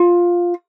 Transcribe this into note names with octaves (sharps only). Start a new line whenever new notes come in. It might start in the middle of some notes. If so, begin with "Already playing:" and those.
Already playing: F4